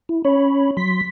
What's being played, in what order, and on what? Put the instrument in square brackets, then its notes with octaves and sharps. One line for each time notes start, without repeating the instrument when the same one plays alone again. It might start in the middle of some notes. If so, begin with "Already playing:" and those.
[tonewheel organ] E4
[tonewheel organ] C#4 B5 [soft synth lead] C#5
[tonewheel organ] F#3 C6 [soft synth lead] B6